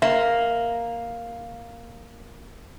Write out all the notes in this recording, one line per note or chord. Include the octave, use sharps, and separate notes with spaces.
A#3 E5